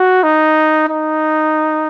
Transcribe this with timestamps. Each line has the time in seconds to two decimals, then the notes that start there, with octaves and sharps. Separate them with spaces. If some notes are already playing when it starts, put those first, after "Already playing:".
Already playing: F#4
0.23 D#4
0.89 D#4